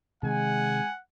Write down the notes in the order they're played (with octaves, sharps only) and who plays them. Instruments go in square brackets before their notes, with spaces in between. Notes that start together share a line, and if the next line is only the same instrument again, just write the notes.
[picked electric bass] C3 D#3 [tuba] G#3 [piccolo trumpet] F#5 [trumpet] G#5